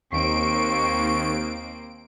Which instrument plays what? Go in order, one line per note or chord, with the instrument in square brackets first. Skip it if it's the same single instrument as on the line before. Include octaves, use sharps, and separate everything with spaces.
[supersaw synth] D#2 D7 [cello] A#3 C4 [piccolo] C#6